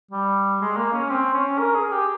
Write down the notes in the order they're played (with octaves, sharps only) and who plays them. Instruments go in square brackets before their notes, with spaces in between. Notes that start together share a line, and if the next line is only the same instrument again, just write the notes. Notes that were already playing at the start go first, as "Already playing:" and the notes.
[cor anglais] G3
G#3
A#3
C#4
C4
C#4
A#4
G#4
G4